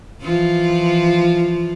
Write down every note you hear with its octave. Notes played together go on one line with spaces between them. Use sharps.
E3 F3 F4